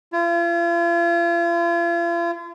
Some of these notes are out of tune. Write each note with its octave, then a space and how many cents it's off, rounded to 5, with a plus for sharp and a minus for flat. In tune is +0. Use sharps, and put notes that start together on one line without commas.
F4 -40